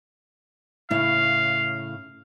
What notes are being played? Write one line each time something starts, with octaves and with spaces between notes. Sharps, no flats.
A2 C#3 E4 F5